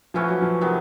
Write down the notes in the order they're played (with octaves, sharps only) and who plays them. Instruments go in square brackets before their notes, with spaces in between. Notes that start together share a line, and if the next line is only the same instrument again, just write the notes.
[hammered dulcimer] E3 A3 C#4 F#4 [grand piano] F3
[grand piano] F#3
F3
[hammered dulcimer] C3 D#3 F#3 B3